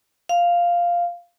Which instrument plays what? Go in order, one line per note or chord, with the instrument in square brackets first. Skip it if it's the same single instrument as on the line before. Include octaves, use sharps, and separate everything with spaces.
[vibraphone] F5